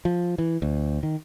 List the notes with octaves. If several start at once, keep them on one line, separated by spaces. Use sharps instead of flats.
F3
E3
D2
D#3